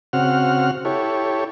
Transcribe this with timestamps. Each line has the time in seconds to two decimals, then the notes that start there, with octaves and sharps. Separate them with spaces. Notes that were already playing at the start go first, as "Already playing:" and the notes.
0.13 C#3 C4 F#4 F#5 F6
0.85 E4 G4 A4 C#5